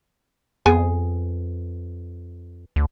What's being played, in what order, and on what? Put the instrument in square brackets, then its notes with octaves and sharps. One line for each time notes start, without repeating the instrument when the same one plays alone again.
[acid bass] F2 [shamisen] B3 G#4 G#5
[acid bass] D2